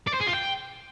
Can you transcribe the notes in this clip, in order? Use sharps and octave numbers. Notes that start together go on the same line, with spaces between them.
D5
C5
G#4
F4
G5